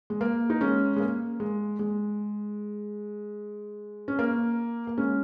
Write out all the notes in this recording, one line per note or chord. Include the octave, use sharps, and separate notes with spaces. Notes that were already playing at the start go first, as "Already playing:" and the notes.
G#3
A#3
D#4
G#3 C#4
G#3
A#3
G#3
G#3
C#4
A#3
A#3
G#3 C#4